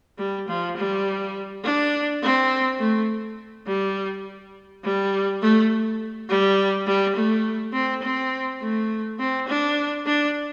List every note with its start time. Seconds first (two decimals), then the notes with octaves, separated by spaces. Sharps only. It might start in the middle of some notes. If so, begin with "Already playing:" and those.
0.18 G3
0.48 F3
0.76 G3
1.64 D4
2.23 C4
2.79 A3
3.67 G3
4.84 G3
5.42 A3
6.29 G3
6.87 G3
7.15 A3
7.73 C4
8.02 C4
8.60 A3
9.19 C4
9.48 D4
10.06 D4